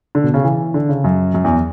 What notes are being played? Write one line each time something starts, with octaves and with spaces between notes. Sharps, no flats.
D3
B2
C#3
E3
D3
C#3
F#2
F#2
E2